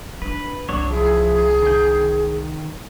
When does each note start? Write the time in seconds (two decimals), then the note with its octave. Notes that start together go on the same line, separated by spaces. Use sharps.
0.22 D4 B4
0.69 C2 F#3 D4 C#5
0.90 F3 E4 G#4
1.63 D#3 G6